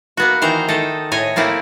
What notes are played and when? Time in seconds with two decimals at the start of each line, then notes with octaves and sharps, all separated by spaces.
0.17 A#3 B3 F#4
0.42 D#3 E3 C5 A#5
0.68 D#3 A4 D#5
1.12 A2 C#5 D#5 G#5
1.36 A3 A#3 C4 E4